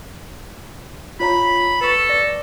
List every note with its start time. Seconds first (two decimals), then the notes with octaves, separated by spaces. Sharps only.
1.20 F4 C#5 A#5 B5
1.81 A4 B4 C#6
2.09 D5 A#6